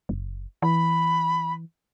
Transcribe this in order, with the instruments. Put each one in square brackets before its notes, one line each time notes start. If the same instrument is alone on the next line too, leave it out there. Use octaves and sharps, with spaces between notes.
[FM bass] F#1
[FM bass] E3 [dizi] B5